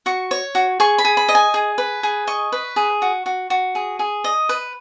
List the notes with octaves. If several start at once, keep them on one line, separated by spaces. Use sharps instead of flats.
F#4 C#6
C#5
F#4
G#4 C#6
B5
G#4
B5
D#5
G#5
G#4
B4
G#4
D#5 C#6
B4
G#4
F#4
F#4
F#4
G#4
G#4
D#5
B4